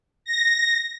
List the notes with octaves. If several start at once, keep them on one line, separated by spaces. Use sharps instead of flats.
A#6